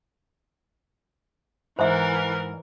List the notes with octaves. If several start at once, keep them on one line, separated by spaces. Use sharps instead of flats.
G#2 E3 A#4 C5 E5